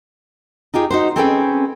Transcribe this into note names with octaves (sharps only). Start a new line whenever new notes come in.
D#4 F4 G4 G#4
D#4 F#4 C5
C4 C#4 G#4 A4 B4 G5